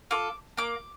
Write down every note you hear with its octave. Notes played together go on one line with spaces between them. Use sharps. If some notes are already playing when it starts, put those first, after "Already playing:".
F4 A4 D6
A#3 D6